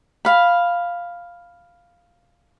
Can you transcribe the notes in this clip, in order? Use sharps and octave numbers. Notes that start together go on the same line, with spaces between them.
F5 B5